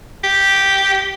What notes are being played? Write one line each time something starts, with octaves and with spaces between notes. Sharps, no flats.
G4